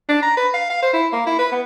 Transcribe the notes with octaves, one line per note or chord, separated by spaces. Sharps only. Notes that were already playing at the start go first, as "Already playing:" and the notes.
D4
A#5
B4
F5
F5
C5
E4
A#3
E4
B4
B3